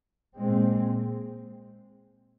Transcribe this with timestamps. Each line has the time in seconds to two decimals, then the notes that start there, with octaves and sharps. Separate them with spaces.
0.36 A#2 G#3 C4